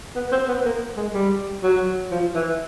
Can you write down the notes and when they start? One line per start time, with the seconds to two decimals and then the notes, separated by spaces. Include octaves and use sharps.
0.16 B3
0.32 C4
0.48 B3
0.65 A#3
0.97 G#3
1.14 G3
1.63 F#3
2.11 F3
2.35 E3